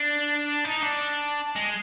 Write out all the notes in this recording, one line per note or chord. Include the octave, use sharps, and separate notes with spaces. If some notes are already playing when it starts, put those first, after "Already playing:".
Already playing: D4
D#4
D4
G#3